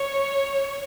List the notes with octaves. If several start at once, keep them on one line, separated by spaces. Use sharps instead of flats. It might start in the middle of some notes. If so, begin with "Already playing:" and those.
Already playing: C#5